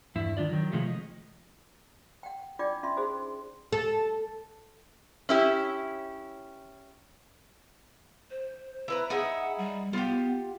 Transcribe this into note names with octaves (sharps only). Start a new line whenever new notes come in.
E2 G2 E4
D#3 D4 F4 D5
D#3 F#3
C3 F3 G#3 A3
D#5
F#5 G5
D4 F4 D5 G5 D6
C#4 F4 E5 C6
D#4 F#4 G#4 C5
A4
C#4 E4 G4
C5
E4 B4 A#5
D#4 E4 G#4 F#5
G3
B3 F4 G4